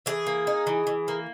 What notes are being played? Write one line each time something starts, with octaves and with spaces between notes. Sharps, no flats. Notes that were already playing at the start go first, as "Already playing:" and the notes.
E3 G#4
A#3
D#4
E3
E3
A#3